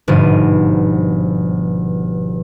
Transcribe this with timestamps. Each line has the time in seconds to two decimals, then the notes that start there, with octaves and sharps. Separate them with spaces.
0.08 G1 G#2 B2 F3 D#7